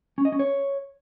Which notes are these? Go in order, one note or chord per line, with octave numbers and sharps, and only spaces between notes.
C#4
D#5
C#4
C#5